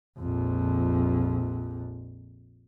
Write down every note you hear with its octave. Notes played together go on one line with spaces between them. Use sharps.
A#1 F2